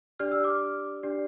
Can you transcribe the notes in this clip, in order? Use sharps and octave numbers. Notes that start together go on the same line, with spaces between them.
D4 G4 D5 F6
E6
D6 F6
D4 G4 D5